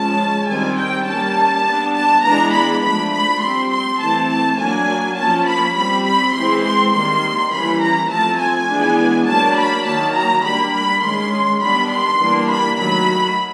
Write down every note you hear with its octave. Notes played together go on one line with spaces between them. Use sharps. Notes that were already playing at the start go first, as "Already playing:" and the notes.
Already playing: F3 G#3 C#4 A5
D#3 G3 C4 G#5
G5
G3 A#3 C#4 A5
G3 B3 D4
A5
E3 G#3 B3 D4 A#5
B5
F3 A3 D4 B5
B5
G3 C4 C6
C6
E3 A3 C4 A5
A5
F#3 A#3 D4 G#5
F3 A#3 C#4 A5
B5
G3 C4 B5
B5
E3 G#3 C4 C6
C6
D#3 G3 A#3 C6
E3 G3 A#3 C#4 B5
A#5
F3 A3 C4 A5
G#5
E3 G#3 B3 D4
F#3 A#3 D4 A5
B5
D#3 F#3 A#3 A5
A#5
G3 A#3 D4 B5
B5
D#3 G#3 C#4 C6
D#3 G3 B3 D4 B5
C6
E3 G3 A#3 D4
B5
D#3 F#3 A3 B5